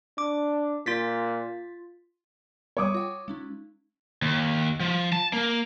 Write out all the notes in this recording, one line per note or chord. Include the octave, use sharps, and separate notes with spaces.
D4 D6
A#2 F4 A6 B6
G3 B3 C#5 D6 D#6
F4 F#5 G5
G#3 C#4 D#4
D#2
F3
A5
A#3